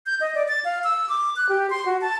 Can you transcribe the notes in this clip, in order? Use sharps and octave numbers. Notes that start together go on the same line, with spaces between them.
G6
D#5
D5
A6
F5
E6
D6
F#6
G4
C6
F#4
A5